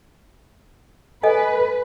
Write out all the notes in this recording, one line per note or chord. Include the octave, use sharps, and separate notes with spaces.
A4 B4 D#5 G#5